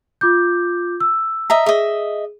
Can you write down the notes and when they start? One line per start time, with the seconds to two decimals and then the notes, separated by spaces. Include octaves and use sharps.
0.21 F4 D6 G6
1.00 E6
1.50 D#5 E5 A#5
1.66 G#4 D#5 E5